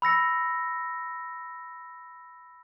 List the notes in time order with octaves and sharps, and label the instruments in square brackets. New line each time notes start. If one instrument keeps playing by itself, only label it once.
[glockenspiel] B5 E6 A#6 C#7